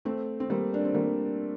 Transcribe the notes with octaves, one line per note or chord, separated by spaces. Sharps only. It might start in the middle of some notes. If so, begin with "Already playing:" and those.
A3 C4
C4
G3 A#3
D4
C4
G3 A#3